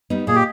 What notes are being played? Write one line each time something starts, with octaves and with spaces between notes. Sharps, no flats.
G3 B3 D#4
A#2 G#4
G4